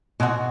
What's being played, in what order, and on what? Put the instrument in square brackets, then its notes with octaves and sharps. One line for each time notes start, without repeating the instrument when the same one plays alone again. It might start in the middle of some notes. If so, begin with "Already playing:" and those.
[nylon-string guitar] B2 [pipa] E3 G#3 D#4 F#4